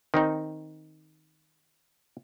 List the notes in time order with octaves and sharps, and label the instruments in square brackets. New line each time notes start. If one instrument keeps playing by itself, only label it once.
[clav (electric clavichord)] D#3 C4 D#4